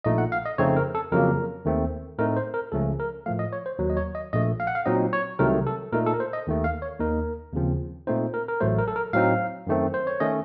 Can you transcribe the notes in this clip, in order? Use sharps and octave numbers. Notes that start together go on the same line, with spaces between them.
A#1 A#2 A3 D#4 D#5
F#5
F5
D#5
F2 C#3 A3 C4 D#4 C#5
A#4
A4
F2 C#3 F#3 A#3 A#4
D#2 D#3 A3 C4
A2 A3 C4 D#4 A#4
C5
A#4
C#2 C#3 F3 A3 C#4 A4
A#4
A2 F3 A3 F5
D#5
C#5
C5
D#2 D#3 F#3
D#5
C#5
D#5
A#1 A#2 A3 D#5
F5
F#5
F5
A#2 F#3 C4 D#4 D#5
C#5
C2 C3 D#3 F#3 A3 A#4
A4
A#2 A3 D#4 A#4
A4
A#4
C5
D#5
D#2 D#3 A3
F5
C#5
D#2 D#3 A#3 D#4 A#4
D#2 C#3 F3 C4
A#2 A3 C4 D#4 C5
A#4
A#4
A1 A2 F#3 A3 C5
A#4
A4
A#4
A2 F#3 C4 D#4 F5
F#2 D#3 A3 C4
C5
C#5
D#3 A3 C#4 D#5